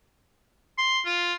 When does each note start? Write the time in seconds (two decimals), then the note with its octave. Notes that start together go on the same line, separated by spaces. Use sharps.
0.78 C6
1.06 F4